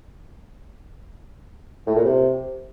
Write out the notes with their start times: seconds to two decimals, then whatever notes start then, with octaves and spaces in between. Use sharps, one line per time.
1.87 A2
1.96 A#2
2.05 C3